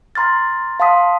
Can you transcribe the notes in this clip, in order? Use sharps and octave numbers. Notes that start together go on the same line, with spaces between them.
A#5 C6 F6 A6
F5 A5 C6 D#6 B6